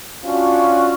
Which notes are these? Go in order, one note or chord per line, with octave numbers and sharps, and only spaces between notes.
C#4 D4 F4 F#4